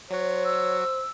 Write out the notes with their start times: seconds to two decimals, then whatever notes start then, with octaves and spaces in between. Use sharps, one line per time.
0.10 F#3 F#4 C5 C#5
0.45 E6